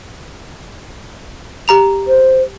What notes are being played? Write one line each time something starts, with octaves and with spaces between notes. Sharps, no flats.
G4 A#5 F7
C5